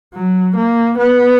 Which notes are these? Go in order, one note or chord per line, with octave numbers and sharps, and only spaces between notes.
F#3
A#3
B3